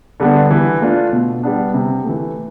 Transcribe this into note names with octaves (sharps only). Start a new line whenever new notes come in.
D3 G3 B3 D4
E3
A3 D4 F4
B2
G3 B3 D4
C3
E3 A3